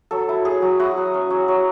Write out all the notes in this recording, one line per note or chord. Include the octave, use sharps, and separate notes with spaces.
F#3 A4
E4
F#3 G#4
F#3
E4 F#4
F#3
C#4
F#3
F#3